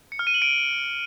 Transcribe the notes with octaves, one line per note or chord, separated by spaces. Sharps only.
C#7
F6
D#7
F#7
D7